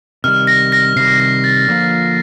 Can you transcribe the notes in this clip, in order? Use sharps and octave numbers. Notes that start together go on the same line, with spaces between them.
C3 D#3 G3 F6
A#6
A#6
C3 D#3 G3 C7
A#6
A6
D3 F3 A#3 F4